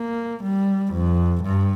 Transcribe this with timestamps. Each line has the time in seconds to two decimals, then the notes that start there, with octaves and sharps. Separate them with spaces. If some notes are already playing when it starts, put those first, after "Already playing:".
Already playing: A#3
0.43 G3
0.93 F2
1.43 G2